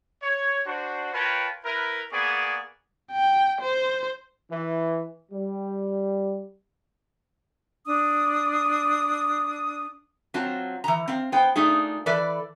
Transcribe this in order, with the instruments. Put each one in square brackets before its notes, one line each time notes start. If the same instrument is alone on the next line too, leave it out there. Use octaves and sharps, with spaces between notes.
[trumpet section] C#5
D4 F#4 C5
F4 A#4 B4 C#5 G5 A5
E4 A#4 B4
A#3 B3 G#4 D5 G#5 C#6
[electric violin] G5
C5
[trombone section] E3
G3
[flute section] D4 D#6
[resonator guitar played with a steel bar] F#3 C4 F4 A5
E3 A#5
C4 F5
B3 C5 G5
A3 D4 D#4 F4 G#4
E3 A4 B4 D5